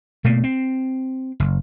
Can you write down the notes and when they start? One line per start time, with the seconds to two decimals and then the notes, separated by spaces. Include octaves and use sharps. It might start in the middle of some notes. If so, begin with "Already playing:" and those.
0.24 B2 A3 A#3
0.44 C4
1.40 F#1